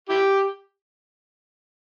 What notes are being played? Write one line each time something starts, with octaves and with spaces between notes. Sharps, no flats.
E4 G4